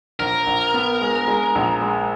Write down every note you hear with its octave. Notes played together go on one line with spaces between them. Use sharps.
A#1 A#4
A#1
B3
G#3
G#3
A#1
G#3